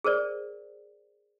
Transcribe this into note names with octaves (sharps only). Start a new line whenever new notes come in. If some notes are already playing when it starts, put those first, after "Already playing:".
G#4 A#4 C5 D5